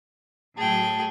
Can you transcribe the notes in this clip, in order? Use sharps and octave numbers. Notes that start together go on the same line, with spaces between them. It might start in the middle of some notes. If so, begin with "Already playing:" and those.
A2 F#3 G#4 G5 A5